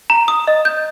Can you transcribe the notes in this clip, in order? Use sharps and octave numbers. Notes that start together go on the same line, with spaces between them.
A#5
D#6
D#5
G6